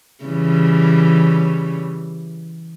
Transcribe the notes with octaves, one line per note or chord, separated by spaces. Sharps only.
C#3 E3 G3